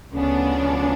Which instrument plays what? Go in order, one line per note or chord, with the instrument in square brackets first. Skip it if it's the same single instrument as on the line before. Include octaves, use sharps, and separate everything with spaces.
[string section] D2 C#3 F3 B3 D4 [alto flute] C#4